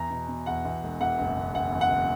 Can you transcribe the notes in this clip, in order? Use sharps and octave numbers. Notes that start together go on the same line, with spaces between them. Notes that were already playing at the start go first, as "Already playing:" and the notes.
Already playing: E2 A#5
B2
B2
E2 F#5
E2
E1
E2 F#5
F#1
F#1
F#1 F#5
E2
F#5
F#1